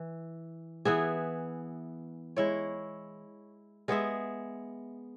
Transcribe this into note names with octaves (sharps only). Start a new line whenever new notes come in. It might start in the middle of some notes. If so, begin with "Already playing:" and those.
Already playing: E3
E3 B3 G#4 E5
G#3 E4 C#5
G#3 B3 G#4 E5